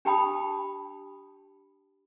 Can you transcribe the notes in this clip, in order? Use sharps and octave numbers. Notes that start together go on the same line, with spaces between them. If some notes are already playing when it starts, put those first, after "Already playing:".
D4 G4 G5 A5 B5 D#6